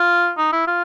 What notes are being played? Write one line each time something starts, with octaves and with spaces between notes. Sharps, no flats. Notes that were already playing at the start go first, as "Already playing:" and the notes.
Already playing: F4
D#4
E4
F4